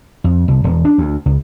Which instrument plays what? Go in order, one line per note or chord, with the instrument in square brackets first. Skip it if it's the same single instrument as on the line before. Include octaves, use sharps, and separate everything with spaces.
[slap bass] F2
C2
E1
D4
D2
C#2